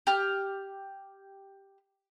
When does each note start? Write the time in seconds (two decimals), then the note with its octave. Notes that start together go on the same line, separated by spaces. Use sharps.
0.07 G4 F6